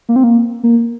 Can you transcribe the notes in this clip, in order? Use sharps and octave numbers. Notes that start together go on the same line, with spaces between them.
A#3
C4
A#3
A#3